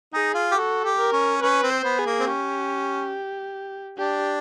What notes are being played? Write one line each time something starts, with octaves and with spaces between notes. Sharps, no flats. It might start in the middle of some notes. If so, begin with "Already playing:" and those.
D#4 G#4
F4
G4
F#4 A4
G4
A#4
C#4
C#4 B4
C4
C5
B3
G#4
A#3
C4
C#4 G4
D4 G4